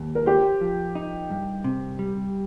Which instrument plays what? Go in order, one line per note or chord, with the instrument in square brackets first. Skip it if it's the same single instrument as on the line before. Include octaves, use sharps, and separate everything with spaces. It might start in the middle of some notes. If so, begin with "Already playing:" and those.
Already playing: [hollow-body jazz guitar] D#2
[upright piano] A#4
[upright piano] G4 [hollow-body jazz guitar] C5
[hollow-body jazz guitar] F3
D#4
G2
C3
G3